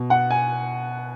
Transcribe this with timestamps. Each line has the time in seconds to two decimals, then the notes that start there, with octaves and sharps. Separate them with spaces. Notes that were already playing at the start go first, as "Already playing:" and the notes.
Already playing: B2
0.10 F#5
0.31 G#5